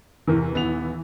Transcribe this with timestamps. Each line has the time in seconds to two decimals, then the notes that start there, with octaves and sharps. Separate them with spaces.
0.27 E2 C3 E3 A#4
0.53 D#1 B3 F7